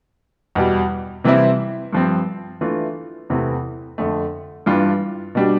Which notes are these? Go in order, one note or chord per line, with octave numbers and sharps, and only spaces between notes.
E2 B2 G3
C3 E3 G3 C4 E4
G2 F3 C4
E3 A3 D4 F4
E2 C3 E3 A3
F2 D3 A3
G2 E3 G3 D4 F4
B2 G3 D4